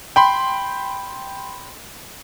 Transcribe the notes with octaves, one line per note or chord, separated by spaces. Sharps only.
G5 B5 C6